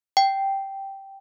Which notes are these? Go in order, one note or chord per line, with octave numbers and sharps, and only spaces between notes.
G5